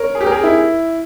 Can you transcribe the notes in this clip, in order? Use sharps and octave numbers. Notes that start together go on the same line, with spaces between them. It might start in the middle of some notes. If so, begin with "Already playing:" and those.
Already playing: A#4 C#5
G#4
G4
A#4
G#4
E4